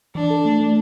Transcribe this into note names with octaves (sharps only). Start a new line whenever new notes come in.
E3 D4
A4
A3
A3